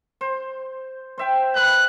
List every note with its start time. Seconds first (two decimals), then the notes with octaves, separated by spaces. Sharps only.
0.21 C5
1.18 C5 E5 G5
1.55 B4 E5 B5 F#6